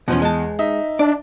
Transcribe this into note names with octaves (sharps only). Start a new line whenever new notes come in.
E2 B2 F3 C#4
G#3 A5
D#4 E5
D4 D5